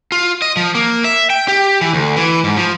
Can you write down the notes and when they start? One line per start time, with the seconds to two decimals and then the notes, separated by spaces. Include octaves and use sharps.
0.12 F4
0.42 D#5
0.57 F3
0.75 A#3
1.04 E5
1.30 G5
1.48 G4
1.81 E3
1.93 D2
2.16 E3
2.44 G#2
2.57 F3